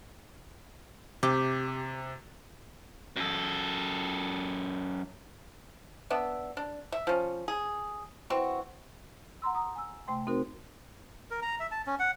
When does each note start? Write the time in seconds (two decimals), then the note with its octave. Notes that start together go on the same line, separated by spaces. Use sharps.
1.23 C3 G4
3.16 F#2 A4
6.10 B3 D4 E5
6.57 D4
6.92 E5
7.07 F3 C#4
7.48 G#4
8.30 E3 C4 F#4
9.42 F#5 A#5 C6 E6
9.55 A#5 D#6
9.76 G#5 E6
10.07 C3 A3 G5 C6
10.27 C4 D#4 F#4 A#4 C5
11.31 A#4
11.42 A#5
11.60 E5
11.71 A5
11.87 C#4
11.99 F#5